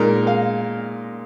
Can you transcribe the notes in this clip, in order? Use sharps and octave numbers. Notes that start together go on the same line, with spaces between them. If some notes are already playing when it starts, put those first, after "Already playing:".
Already playing: A#2 G#3 D#4 A#4
F5